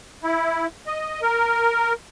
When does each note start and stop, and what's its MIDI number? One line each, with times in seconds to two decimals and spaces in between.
0.24 0.67 64
0.87 1.21 75
1.22 1.93 70